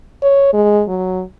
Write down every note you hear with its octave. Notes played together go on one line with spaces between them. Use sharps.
C#5
G#3
F#3